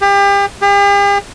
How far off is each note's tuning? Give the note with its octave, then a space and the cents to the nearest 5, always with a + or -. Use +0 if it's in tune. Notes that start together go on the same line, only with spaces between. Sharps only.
G4 +35
G4 +45